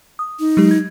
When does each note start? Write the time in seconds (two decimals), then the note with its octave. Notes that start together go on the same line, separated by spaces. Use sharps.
0.19 D#6
0.40 D#4
0.57 F#3 G#3 G4
0.71 G#6